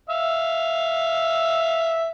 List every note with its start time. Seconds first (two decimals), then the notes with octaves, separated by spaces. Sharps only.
0.10 E5 F5